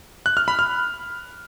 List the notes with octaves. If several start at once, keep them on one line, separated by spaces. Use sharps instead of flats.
F#6
F6
B5
F6